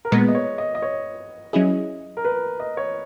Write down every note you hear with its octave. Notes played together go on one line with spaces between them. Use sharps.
A#4
A#2 G#3 B3 B4
D#5
C#5
D#5
D#5
C#5
F#3 C#4 E4 G#4 D#5
A#4
B4
D#5
C#5